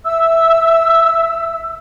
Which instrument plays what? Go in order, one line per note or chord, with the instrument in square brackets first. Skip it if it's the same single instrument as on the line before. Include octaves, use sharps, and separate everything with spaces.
[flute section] E5 E6